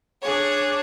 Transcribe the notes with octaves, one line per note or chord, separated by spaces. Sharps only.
D4 G#4 C#5